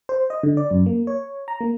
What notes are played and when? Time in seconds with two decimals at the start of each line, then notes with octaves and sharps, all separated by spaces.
0.09 C5
0.30 D#5
0.43 D3
0.57 D5
0.71 F#2
0.86 A#3
1.07 C#5
1.48 A#5
1.61 A#3